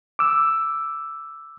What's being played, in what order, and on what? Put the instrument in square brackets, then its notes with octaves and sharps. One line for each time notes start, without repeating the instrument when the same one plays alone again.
[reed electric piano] D6 E6